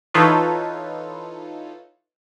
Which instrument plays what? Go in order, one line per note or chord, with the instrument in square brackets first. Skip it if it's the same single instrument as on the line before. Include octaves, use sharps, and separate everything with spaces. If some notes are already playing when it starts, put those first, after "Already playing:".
[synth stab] E3 D#4 F4 A4 B4 C#5